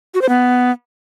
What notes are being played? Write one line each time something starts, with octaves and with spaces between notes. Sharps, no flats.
F#4
C5
B3